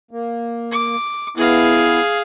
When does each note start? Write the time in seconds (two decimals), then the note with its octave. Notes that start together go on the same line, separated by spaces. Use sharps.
0.11 A#3
0.72 D6
1.37 B3 E4 G#4 F5